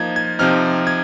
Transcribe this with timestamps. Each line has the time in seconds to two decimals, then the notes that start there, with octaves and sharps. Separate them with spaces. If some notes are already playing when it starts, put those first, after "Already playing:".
Already playing: F3 A#3 D#4 G#6
0.16 G#6
0.39 C3 F3 C4 D#4 F6
0.87 G#6